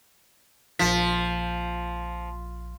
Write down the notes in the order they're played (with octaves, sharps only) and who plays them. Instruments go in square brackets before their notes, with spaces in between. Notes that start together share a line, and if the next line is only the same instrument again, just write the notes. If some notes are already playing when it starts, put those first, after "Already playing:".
[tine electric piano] A#1 B6 [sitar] F3